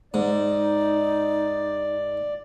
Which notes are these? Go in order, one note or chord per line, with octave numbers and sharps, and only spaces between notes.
G#2 D#4 D5